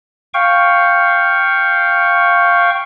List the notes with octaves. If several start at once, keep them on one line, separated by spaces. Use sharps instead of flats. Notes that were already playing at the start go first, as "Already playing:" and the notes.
F5 G5 C#6